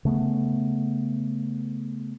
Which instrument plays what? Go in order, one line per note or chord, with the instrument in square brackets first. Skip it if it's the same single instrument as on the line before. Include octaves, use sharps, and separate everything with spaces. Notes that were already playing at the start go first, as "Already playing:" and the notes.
[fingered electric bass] C#3 A3 B3